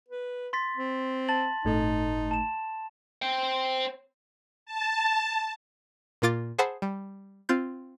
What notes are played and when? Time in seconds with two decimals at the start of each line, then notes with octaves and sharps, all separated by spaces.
0.09 B4
0.53 C6 A6 B6
0.76 C4
1.28 A5 A6 F#7
1.65 G1 A2 A3 D#4
2.31 A5 E7
3.22 C5 G5
4.66 A5
6.22 A#2 A#3 F4 D6 A6
6.58 G#4 C5 F#5 A5 B5 E6
6.82 G3
7.49 C4 F4 C6 G6